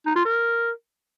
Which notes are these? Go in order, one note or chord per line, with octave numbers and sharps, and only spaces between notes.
D#4
F4
A#4